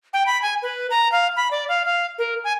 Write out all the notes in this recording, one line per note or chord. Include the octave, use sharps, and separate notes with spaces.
G5
B5
G#5
B4
A#5
F5
B5
D5
F5
F5
A#4
G#5